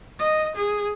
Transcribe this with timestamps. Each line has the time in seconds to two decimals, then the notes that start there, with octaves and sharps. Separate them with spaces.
0.19 D#5
0.56 G#4